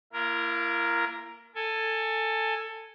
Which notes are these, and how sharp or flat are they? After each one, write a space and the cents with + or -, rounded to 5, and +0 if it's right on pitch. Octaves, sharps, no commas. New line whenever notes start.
A#3 +0 E4 +45 A#4 +0
A4 +15 G#5 +0